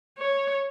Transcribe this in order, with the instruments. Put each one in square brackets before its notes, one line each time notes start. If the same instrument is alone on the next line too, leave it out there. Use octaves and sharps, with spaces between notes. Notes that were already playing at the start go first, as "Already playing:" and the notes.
[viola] C#5